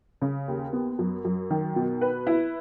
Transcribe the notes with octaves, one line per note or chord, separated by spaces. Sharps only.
C#3
D#2
B3
F#2
F#2
D#3
B2
B4
E4